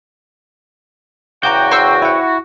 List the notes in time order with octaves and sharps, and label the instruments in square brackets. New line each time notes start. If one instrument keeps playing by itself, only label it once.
[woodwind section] E2 C#3 G5 [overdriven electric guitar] F#4 [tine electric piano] A#5 D6 G6
[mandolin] C5 C#6 E6
[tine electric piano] E4 F#5